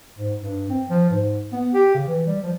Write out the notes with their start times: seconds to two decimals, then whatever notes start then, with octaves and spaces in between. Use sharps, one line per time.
0.18 G#2
0.40 G2
0.70 C4
0.89 F3
1.09 G#2
1.52 B3
1.73 G4
1.95 C#3
2.07 E3
2.27 G3
2.43 F3